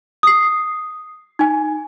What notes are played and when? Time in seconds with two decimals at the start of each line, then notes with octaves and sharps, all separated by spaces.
0.23 D#6 C7
1.39 D#4 G#5